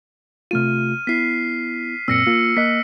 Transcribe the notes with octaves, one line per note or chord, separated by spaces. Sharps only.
C3 A3 F4 F6 D#7
B3 E4 B6 C7
F#2 A#2 C4 E6 A#6 C#7
A#3 F4 C#7
A#3 D#5 F#6 B6